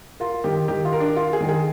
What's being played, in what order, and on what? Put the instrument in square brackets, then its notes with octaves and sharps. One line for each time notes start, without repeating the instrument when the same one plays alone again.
[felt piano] F4 [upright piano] A#4
[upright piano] D#3 [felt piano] G4
[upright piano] D#3 [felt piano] G4
[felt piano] F4
[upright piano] A#4
[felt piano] D4
[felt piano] F4 [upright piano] A#4
[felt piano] G#4
[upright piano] D#3
[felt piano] G#4